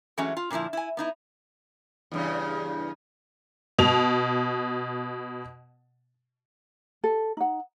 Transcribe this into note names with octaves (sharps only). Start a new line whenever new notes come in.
E3 F#3 G#3 A3 C#4
F4
A#2 D3 E3 F3 E4
E4 G#5
B3 D#4 E4
E2 G2 C#3
B2 F7
A4
D#4 F#5